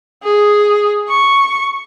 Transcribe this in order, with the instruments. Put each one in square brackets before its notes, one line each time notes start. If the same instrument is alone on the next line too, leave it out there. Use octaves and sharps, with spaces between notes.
[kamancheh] G#4
C#6